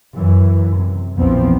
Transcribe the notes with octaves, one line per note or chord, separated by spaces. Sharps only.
F#2 E3
C3
A#1 E2 F3 B3 C4